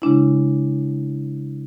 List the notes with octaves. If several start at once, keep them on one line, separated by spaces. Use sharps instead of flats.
C#3 G#3 D4 E4